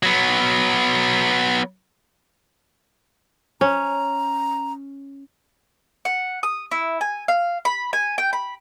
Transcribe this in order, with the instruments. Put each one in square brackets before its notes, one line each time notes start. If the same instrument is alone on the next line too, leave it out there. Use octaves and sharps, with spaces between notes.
[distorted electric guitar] F#3 B3
[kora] C#4 [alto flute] A#5
[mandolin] F#5
D#6
E4
G#5
F5
B5
G#5
G5
B5